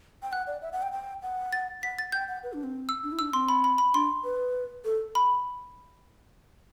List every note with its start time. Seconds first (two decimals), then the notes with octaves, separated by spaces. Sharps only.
0.23 G5
0.32 F#5 F#6
0.47 D5
0.62 E5
0.73 F#5
0.82 G5
0.92 G5
1.22 F#5
1.52 A6
1.83 F#5 B6
1.99 A6
2.12 G5 G6
2.28 F#5
2.43 B4
2.53 D4
2.64 C4
2.89 E6
3.03 D4
3.12 E4
3.19 D4 E6
3.33 C4 C6
3.49 B5
3.64 B5
3.78 B5
3.94 D4 C6
4.24 B4
4.85 A4
5.15 B5